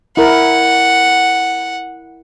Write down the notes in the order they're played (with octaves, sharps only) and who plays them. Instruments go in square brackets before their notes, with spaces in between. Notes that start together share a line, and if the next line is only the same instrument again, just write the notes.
[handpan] E4 A#4 [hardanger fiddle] F#5